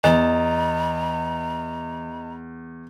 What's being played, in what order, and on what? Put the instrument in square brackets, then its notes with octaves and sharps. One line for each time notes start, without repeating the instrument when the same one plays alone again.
[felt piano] E2 [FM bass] E3 [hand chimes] D#5 [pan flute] A#5